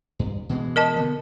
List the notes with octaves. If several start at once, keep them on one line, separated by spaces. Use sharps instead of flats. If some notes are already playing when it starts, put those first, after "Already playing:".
G2
B2 E3 G#3
A#4 D#5 A5
D3 B3